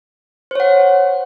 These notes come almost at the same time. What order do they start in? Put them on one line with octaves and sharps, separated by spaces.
C5 C#5 F#5